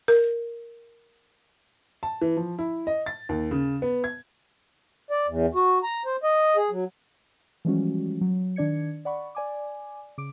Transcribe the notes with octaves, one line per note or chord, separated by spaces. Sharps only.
A#4
A5
E3
F3
E4
D#5
A6
D#2
C#3
B3
G#6
D5
E2
F#4
A#5
C5
D#5
G#4
F#3
E3 F3 G3 G#3 C#4 F#4
F#3
D#3 D4 D5 G#6 C#7
D5 F#5 B5 C#6
D5 G#5 D6
C#3 D6 D7